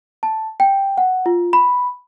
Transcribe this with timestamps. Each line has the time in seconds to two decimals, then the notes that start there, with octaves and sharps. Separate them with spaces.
0.23 A5
0.60 G5
0.98 F#5
1.26 F4
1.53 B5